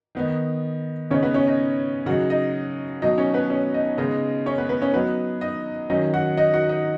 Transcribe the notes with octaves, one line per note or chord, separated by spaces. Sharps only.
D#3 B3 D#4
C#3 B3 C#4 D#4 C#5
B3 B4
C#4 C#5
D#4 D#5
C#3 F#3 D#4 F#4 F#5
D#4 D#5
B2 F#3 D#4 D#5
C#4 C#5
B3 B4
C#4 C#5
D#4 D#5
C#3 G#3 B3 D#4 D#5
C#4 C#5
B3 B4
B3 B4
C#4 C#5
F#3 B3 D#4 B4
D#4 D#5
D#3 F#3 C#4 D#4 D#5
F#4 F#5
D#4 D#5
F#4 F#5
D#4 D#5